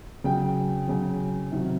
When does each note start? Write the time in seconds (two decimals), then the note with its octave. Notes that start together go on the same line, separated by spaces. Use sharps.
0.24 C#3 F#3 G5
0.88 C#3 F#3
1.51 C3 D#3 F#3